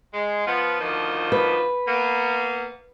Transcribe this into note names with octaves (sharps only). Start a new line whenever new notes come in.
G#3
F3 B3
D2 D#3 F3
B4
A#3 B3